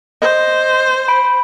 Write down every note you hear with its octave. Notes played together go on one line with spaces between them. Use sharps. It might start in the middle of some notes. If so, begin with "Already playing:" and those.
C5 D#5
B5 D7